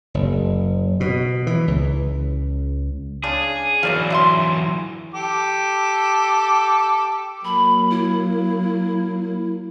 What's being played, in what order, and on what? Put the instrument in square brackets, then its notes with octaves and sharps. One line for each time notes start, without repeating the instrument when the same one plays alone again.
[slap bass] F#1
B2
E3
C#2
[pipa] C#3 D4 [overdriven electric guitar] G#4
[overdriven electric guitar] E3 F#3 [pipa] A#4 D5 F5
[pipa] D3 E5 C6
[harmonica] G4 A4 D6
[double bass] F#3 A#3 [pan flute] B5
[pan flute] E4